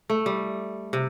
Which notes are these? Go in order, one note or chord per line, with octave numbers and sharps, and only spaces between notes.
A3
G3
C3